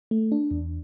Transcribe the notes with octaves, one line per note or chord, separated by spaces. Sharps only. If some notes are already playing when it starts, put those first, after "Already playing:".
A3
D4
E2